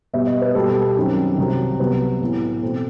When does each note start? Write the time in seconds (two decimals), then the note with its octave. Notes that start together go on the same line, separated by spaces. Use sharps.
0.13 B2 G3 B3 E5
0.27 D#5
0.41 B4
0.55 B2 G3 B3 A4
0.97 F#2 D#3 F#3 C4
1.38 C2 C3 F#3 C4
1.79 C2 C3 F#3 B3 B4
2.21 A2 E3 B3
2.62 B2 A3 C4 A4